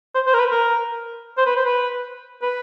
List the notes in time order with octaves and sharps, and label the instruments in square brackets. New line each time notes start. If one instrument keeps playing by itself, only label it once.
[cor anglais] C5
C5
A#4
B4
A#4
C5
B4
C5
B4
B4